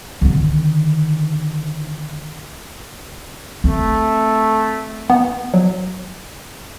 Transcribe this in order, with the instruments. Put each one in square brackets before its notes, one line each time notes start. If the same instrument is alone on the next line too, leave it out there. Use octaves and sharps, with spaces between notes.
[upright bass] D3 D#3
[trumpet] A3 [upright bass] C4
[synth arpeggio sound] B3
F#3